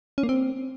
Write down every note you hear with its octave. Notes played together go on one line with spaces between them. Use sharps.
C#4
A#3
C4